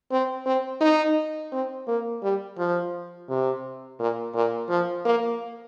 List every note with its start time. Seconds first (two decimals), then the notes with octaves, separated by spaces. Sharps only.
0.12 C4
0.46 C4
0.81 D#4
1.52 C4
1.88 A#3
2.23 G3
2.58 F3
3.29 C3
3.99 A#2
4.35 A#2
4.69 F3
5.05 A#3